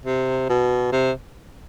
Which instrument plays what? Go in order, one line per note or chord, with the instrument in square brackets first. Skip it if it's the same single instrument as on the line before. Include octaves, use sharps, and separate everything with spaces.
[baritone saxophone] C3
B2
C3